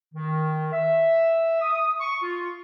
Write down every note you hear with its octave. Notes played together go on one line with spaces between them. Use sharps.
D#3
E5
D#6
C#6
F4